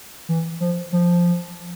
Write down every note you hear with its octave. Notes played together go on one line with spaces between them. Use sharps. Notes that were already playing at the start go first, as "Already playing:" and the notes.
E3
F3
F3